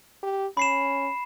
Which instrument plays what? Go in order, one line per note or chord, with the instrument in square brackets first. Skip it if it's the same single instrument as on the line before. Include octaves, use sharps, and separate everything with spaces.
[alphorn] G4
[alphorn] C#4 [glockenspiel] B5 C7 E7